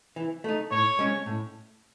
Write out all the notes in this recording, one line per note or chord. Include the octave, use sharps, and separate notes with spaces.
E3
A3 D#4
A2 C#5
G#3 C#4
A2